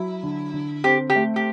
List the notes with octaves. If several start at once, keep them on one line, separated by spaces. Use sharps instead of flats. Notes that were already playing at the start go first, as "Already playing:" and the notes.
Already playing: F#3 E4
D3
D3
C4 G4
G4
A3
G4